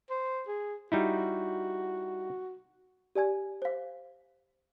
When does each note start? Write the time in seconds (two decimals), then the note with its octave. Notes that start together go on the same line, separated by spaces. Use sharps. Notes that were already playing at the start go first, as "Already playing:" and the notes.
0.10 C5
0.47 G#4
0.92 G3 D#4 E4 F#4
3.15 G4 D5 G#5 G#6
3.62 C5 F5